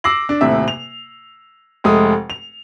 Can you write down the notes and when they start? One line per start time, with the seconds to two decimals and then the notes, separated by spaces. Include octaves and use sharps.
0.04 D6 E6 A#6 C7 F#7
0.29 D4
0.41 D#1 A2 C3 E5
0.68 F7
1.84 F1 G#3 A3 D#6
2.30 F7